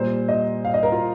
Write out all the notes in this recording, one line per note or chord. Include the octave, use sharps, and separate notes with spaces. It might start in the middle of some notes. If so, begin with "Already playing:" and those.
Already playing: A#2 G3 C5
D#5
F5
D#5
A#4
F4